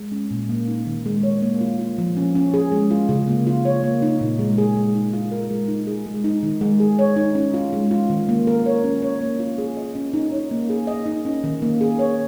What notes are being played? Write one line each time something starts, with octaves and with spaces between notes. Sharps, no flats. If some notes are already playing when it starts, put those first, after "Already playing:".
Already playing: G#3
C#4
A#2
A#3
D#4
D#3
G#3
C#5
A#3
F4
F4
F3
C#4
C#4
G#4
G#3
F4
C#3
A#3
F4
C#5
A#3
D#4
A#2
G#3
G#4
G#3
D#4
F4
A#4
G#3
D#4
G#4
G#3
D#4
D#3
G#3
G#4
C#5
D#4
C#4
F4
G#3
F4
D#3
A#3
A#4
C#5
C#4
C#5
A#3
F4
G#4
D#5
C#4
D#4
C#5
A#3
G#4
D#5
D#4
C#4
D#3
A#3
G#4
C#5